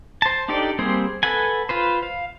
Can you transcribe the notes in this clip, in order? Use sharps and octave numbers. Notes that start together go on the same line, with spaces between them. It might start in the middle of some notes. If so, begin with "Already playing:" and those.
C5 A5
D4 D#4 G4 A4 D5
G3 A#3 C4 G#4 C5
A4 B4 F#5 G#5
F4 B4 C5
F5